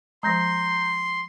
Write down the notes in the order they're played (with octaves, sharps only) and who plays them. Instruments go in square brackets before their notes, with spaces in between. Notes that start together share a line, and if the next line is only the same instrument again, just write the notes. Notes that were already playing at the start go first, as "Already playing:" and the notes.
[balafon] F3 G#3 [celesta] A#5 G6 A#6 [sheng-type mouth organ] C6